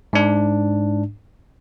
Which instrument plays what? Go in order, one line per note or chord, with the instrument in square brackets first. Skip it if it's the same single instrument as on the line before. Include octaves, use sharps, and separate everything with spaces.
[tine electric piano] G#2 D4